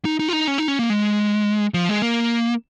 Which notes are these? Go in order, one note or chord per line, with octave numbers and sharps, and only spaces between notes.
D#4
D#4
F4
D#4
C#4
D#4
C#4
A#3
G#3
F3
G#3
A#3